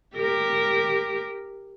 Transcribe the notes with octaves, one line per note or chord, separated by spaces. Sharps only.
G4 A#4